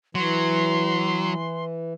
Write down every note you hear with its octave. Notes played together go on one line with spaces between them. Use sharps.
E3 F#3 C6